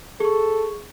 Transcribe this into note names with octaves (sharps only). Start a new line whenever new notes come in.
G#4 A4 C#6